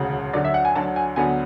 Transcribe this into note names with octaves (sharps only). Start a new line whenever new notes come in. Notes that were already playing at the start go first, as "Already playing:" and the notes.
Already playing: E1 D2 C#3
D2 D3 F#3 D5
E5
F#5
G#5
D2 D3 F#3 A5
G#5
D2 D3 F#3 B3 G#5